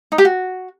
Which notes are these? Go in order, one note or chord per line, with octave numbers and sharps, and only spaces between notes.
D#4
G4
F#4